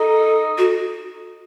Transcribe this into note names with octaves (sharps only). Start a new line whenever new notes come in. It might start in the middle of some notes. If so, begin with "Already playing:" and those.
Already playing: D#4 A4
F#4